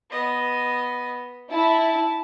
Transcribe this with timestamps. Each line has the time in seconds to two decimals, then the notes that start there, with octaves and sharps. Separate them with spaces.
0.10 B3 D#5
1.50 E4 A5